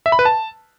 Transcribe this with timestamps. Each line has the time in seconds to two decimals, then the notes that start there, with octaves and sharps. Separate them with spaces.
0.06 E5
0.12 B5
0.19 B4
0.25 A5